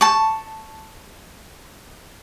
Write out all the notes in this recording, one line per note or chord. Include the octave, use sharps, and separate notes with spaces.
A5 C#6